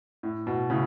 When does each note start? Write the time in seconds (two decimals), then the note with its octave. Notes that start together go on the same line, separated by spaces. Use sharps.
0.23 A2
0.47 B2
0.70 A2 C#3